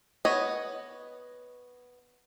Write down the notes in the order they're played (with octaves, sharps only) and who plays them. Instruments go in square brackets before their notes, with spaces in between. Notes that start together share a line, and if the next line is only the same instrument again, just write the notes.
[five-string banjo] B3 B4 C#5 D#5